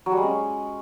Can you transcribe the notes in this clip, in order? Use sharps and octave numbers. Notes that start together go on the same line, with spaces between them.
F#3
G3
G#3
C#4